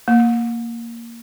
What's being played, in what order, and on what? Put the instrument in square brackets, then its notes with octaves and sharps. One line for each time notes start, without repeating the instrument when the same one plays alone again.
[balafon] A#3